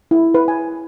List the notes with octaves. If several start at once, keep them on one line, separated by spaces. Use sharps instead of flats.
E4
B4
G#5